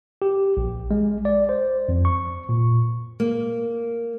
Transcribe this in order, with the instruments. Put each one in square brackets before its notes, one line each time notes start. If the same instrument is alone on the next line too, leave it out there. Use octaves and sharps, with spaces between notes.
[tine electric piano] G4
A#1
G#3
D5
C5
F2
C#6
A#2
[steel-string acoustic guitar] A#3